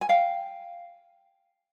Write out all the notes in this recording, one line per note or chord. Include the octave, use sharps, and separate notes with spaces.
G#5
F5 G5